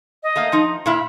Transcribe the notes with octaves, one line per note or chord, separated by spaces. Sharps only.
D#5
A3 A#3 F5
F3 D#4
A#2 E4 F5 B5